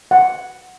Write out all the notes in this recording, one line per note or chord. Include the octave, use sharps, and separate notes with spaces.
F#5